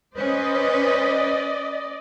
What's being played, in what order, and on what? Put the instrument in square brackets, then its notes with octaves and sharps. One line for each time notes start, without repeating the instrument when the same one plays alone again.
[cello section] C#4 B4 C5 [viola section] D5 D#5